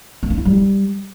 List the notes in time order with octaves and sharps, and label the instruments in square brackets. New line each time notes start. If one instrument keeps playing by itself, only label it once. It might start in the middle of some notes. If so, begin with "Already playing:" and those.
[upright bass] A#3
D4
E4
G3